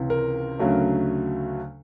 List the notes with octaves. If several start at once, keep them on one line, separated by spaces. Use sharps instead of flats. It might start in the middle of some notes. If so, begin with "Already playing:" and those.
Already playing: C#2 C3 E3
A#4
D2 C#3 F#3 A3